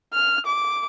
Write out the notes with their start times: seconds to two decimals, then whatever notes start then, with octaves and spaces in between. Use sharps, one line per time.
0.13 F6
0.46 D6